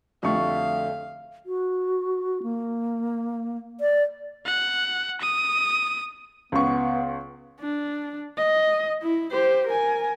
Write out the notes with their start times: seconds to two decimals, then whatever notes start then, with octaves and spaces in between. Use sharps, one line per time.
0.23 F2 D3 G3 A3 F#4 F5 C#6
1.46 F#4
2.43 A#3
3.81 D5
4.46 F#5
5.21 D#6
6.52 C#2 B3 C#6
7.60 D4
8.38 D#5
9.03 E4
9.32 G4 C5
9.67 A#4 G#5